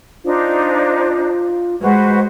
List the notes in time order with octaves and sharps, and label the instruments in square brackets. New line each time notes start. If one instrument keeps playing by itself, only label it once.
[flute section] D4 D#4 C5 [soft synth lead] F4
[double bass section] G#3 [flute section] F#4 B4 C5